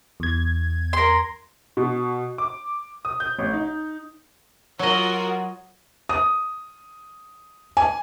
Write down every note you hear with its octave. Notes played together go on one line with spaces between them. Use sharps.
E2 G#6
A#4 C6
B2
D6
D#6
G6
A1
D#4
F#3 F4 F#4 A#4 D#5
D#6
G#5